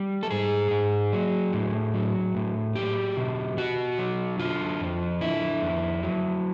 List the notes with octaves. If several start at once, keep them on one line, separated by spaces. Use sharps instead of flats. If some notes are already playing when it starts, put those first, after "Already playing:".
Already playing: G3
A4
G#2 G#4
G#2
F#3
A2
F#3
A2
F#3 G4
B2
B2 F#4
F#3
D3 F4
F2
D3 E4
F2
F#3